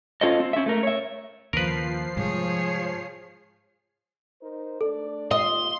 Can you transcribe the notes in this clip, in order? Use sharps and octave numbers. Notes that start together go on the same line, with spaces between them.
C#4 F4 A4 C5 D#5
C4
C#4 E5
A3 A#4
C#5 E5
D#2 C#3 F3 A#4 B4 C7
G#2 C3 G3 G#4 C#5
D#4 A#4 C5
A3 D4 A4 D5
D#2 C4 F4 D#5 C6